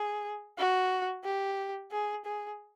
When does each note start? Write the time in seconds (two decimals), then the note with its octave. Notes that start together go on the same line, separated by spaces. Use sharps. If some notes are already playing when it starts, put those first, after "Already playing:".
Already playing: G#4
0.58 F#4
1.24 G4
1.91 G#4
2.25 G#4